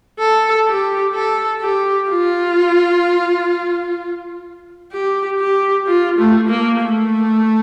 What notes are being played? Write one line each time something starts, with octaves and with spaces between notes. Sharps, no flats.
A4
G4
A4
G4
F4
G4
G4
F4
A3
A#3
A3